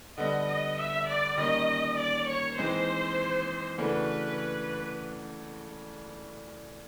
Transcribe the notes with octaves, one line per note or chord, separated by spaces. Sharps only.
D3 G3 B3 D#5
D#5
E5
D5
D#3 G3 A#3 C#4 D#5
D5
C#5
E3 G#3 C4 D#4 C5
C#3 E3 A3 D4 F#4 B4